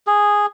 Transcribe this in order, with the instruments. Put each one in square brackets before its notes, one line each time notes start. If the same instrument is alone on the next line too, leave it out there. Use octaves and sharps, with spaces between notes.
[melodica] G#4